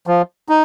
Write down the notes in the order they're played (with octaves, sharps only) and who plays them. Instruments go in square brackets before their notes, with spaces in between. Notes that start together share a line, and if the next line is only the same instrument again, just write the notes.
[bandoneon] F3
D#4